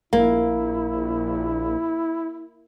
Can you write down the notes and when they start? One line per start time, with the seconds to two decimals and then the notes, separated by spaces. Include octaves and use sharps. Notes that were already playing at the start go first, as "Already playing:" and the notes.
0.13 A#1 A#3 E4